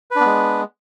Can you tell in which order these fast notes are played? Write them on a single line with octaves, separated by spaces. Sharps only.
B4 D4 B3 G#3